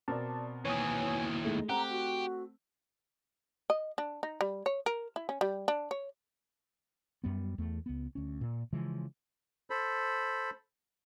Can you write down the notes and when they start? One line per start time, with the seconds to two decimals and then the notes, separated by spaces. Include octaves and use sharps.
0.08 B2 C4 A#4 D5 A5
0.65 D#2 E3 C#5 G#5 D#6
1.44 G#3 A3 D#4
1.69 A3 C4 G4 F#5 A#5
1.91 F#4
3.70 D#5
3.98 D4
4.23 D#4
4.41 G3
4.66 C#5
4.86 A#4
5.16 E4
5.29 C#4
5.41 G3
5.68 D4
5.91 C#5
7.24 F#2 G3 B3
7.58 E2 A3
7.86 C#2 B3
8.15 D2 C#4
8.41 A#2
8.73 C#3 E3 F3 G#3
9.70 A4 C5 B5